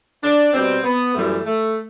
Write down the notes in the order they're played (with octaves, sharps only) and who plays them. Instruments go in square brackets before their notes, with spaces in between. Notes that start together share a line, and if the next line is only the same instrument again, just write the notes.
[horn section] D4
B2 G3 C4
B3
F#2 E3 G3 A3
A3